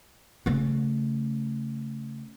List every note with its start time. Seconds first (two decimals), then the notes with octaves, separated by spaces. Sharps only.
0.46 C#3 A3